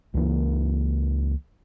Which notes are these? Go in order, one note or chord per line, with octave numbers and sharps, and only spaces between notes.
C#2 E3 A#3